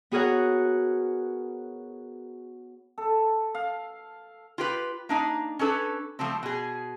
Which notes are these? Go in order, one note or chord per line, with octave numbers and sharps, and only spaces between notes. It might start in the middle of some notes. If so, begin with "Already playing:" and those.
B3 F#4 G#4 A#4 C#5 F#5
A4
F5
F4 G4 B4
A#3 D4 D#4
C#4 D4 A4 B4
F3 G3 A3 C4
B2 G#4